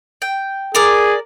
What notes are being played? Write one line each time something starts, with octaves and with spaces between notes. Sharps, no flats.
G5
G#4 A#4 D5